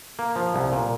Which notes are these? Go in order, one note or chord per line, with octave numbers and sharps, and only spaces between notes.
A#3
F3
C2
A#2